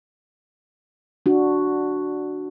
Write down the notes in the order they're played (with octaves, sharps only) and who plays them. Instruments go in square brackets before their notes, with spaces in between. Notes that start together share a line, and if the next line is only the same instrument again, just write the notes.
[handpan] D4 F#4